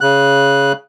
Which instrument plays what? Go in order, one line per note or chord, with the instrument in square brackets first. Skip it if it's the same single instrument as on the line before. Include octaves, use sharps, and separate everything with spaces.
[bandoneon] C#3 F#6